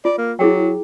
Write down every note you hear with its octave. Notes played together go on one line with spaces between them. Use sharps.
F4 D5
A#3
F#3 E4 G#4 G5